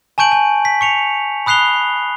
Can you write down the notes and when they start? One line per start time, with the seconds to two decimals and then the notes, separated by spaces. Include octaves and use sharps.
0.18 G#5 A5 C#6 G6 D7 F#7
0.32 G#5
0.65 B6
0.81 C#6 C#7 F7
1.46 B5 D#6 F#6 C7 F7 G7